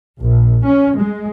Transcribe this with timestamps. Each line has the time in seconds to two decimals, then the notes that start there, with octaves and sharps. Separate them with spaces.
0.21 A#1
0.64 C#4
0.98 G#3